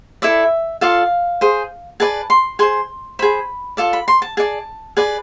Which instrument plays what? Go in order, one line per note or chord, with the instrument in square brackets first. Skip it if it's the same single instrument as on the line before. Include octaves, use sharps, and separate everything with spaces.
[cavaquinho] E4 A4 D5 E5
F4 A4 D5 F5
G#4 C5
G#4 B4 D5 A5
C6
G#4 C5 C6
G#4 C5 B5
F4 A4 D5 A5
B5
C6
A5
G#4 D5 A5
G#4 B4 D5